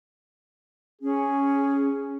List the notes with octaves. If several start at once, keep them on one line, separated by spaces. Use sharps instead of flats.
C#4 G#4